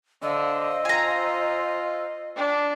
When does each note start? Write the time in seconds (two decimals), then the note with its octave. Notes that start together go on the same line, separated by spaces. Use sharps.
0.22 D3 C5 D#5 F5 E6
0.85 F4 G#5 A#5
2.37 D4